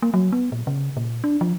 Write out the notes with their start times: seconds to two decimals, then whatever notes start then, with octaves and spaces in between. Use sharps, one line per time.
0.02 A#3
0.14 F#3
0.32 B3
0.52 A#2
0.67 C#3
0.97 A#2
1.24 D4
1.41 F3